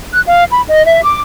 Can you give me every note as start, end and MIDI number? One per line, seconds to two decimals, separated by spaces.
0.13 0.21 90
0.26 0.43 77
0.50 0.61 83
0.67 0.85 75
0.85 1.00 76
1.02 1.20 86